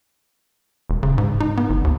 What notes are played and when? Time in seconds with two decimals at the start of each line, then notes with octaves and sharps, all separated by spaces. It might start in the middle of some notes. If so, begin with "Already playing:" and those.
0.90 E1
1.03 C#3
1.18 G#2
1.40 D#4
1.57 B3
1.70 G1
1.84 D#2